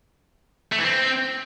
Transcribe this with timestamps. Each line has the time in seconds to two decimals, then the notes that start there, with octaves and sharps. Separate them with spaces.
0.72 A3
0.78 E3
0.84 C4